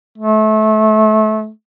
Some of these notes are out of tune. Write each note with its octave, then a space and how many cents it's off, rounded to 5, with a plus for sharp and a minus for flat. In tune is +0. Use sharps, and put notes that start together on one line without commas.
A3 -25